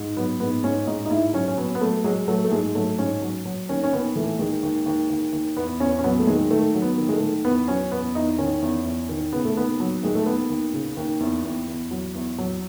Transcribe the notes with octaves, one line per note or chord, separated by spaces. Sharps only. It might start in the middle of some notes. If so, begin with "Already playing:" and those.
Already playing: G#2
F#3 B3
G#2 B3
G#2 C#4
G#2 D#4
D#4
G#2 E4
F#3 C#4
C#4
F#3 B3
B3
F#3 A3
F#3 G#3
F#3 A3
A3
G#2 G#3
F#3 A3
G#2 C#4
F#3
F#3
D#2 C#4
C#4
D#2 B3
E3 A3
D#2 G#3
D#2
D#2
D#2
D#2
E2 B3
E2 C#4
C#4
F#3 B3
A3
D#3 G#3
D#3 A3
F#3
B3
D#3
G#3
A3
D#3
E2 B3
F#3 C#4
E2 B3
E2 D#4
D#3 C#4
E2
E2
D#3
C#3 B3
A3
D#2 B3
F#3
D#2 G#3
A3
D#2 B3
D#2
C#3
D#2
E2
E2
E2
F#3
E2
F#3